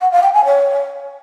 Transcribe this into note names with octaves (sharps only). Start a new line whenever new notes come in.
F#5
F5
G5
G#5
C#5